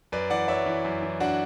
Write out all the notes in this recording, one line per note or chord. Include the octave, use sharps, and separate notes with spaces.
F#2 B4 D5
E3 D5 F#5
F#2 C#5 E5
E3
F#2
E3
D4 F#4